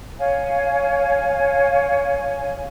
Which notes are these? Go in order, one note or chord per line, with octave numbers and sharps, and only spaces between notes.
C#5 F5 G#5